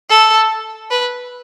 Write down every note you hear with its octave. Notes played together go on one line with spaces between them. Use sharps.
A4
B4